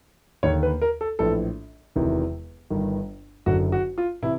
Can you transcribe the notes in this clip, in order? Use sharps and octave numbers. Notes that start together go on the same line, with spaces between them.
D#2 D3 C#5
B4
A#4
A4
A#1 A2 E3 A4
E1 E2 C3 D#3
G1 G2 D#3
F#1 F#2 D3 F#4
F#4
F4
C3 E3 E4